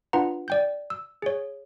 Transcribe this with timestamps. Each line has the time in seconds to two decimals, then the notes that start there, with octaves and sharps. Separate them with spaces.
0.13 D4 F4 B4 F#5 A#5
0.48 D5 G5 G6
0.90 E6
1.22 G#4 C#5